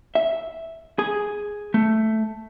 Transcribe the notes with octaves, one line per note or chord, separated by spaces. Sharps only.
E5
G#4
A3